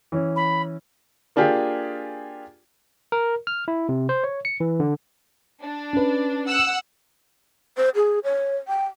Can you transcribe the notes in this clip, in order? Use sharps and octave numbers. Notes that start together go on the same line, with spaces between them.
E3 C#4
B5
A#3 D4 F4 G4 G#4
A#4
F6
E4
C3
C5
C#5
C#7
E3
D3
D4
C#4 B4
F#5 E6 F#6
C5
G#4
C#5
G5